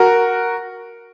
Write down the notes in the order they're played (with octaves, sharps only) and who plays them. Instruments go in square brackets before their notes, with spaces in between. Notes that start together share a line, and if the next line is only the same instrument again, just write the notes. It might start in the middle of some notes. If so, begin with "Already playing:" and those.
Already playing: [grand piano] F#4 A#4